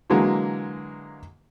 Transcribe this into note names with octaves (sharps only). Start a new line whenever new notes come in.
D3 E3 F#3 G#3 A#3